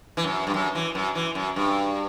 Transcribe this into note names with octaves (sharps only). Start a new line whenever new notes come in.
E3
F#2
G2
F#2
E3
F#2
E3
F#2
G2